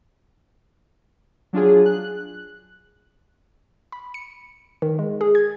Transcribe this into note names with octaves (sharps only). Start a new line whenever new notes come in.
F#3 D4 F4 G#4
F#6
B5
C#7
D#3
G#3
G#4
G#6